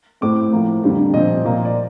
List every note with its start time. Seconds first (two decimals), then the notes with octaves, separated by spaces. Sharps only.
0.21 A2 A3 C4 D6
0.52 A2 F3 A#3
0.83 F2 D3 G3 A#3
1.14 A#2 F3 C4 D#5
1.45 A#2 F3 A#3
1.65 D5